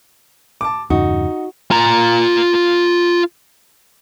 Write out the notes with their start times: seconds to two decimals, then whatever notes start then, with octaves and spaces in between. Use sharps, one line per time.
0.61 A5 D6
0.90 E2 G2 C#3 D#4 F#4
1.71 F4 A#5